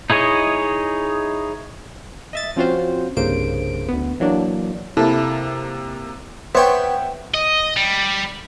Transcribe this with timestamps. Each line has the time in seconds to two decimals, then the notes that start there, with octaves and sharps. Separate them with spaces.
0.10 D#4 E4 G#4 C#5 D#5
2.33 D#5 E5 A6
2.56 F3 C4 C#4 F4 F#4 C5
3.17 C2 G2 C#3 A#3 C5 D7
3.88 D2 B3
4.20 E3 F#3 A#3 D4
4.97 C3 A#3 E4 A4 A5
6.55 B3 C5 C#5 E5 F#5 G5
7.34 D#5
7.77 G3